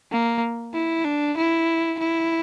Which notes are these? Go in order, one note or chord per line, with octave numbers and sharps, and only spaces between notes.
A#3
E4
D4
E4
E4